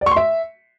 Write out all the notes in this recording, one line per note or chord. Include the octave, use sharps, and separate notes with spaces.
D5
C#6
C6
E5